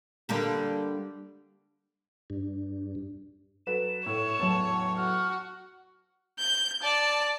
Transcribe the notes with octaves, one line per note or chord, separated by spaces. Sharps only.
D3 G3 A#3
G2
F#3 A4 B4 E7
A2 A3 C#5
E2 A2 F#3 A5
F#4 F6
G6
D5 A5